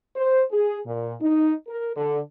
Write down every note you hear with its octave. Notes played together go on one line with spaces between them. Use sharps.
C5
G#4
A#2
D#4
A#4
D3